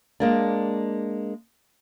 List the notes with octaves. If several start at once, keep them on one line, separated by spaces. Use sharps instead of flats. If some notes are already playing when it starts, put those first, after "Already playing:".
G#3 A#3 D4